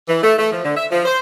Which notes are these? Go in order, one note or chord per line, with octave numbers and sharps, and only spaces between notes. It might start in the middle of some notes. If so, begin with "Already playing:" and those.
E3
A3
A3
F3
D3
E5
F3
C5